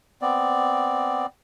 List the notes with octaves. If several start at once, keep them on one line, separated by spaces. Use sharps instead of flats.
B3 C4 D5